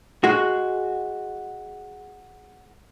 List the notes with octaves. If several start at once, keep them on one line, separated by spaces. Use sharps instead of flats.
G#3 F#4